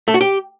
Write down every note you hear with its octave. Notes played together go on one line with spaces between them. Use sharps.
A3
F#4
G4